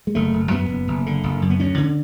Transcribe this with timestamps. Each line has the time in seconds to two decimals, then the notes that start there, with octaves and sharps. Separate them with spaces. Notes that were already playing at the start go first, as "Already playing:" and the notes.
0.07 G#3
0.15 F#1 A3
0.33 F#1
0.51 F#2 B3
0.69 F#1
0.88 F#1
1.06 D3
1.23 F#1
1.42 F#2
1.50 B3
1.60 D2 C#4
1.78 D3